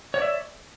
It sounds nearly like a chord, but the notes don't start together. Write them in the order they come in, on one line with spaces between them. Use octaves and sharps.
C#5 D5 E5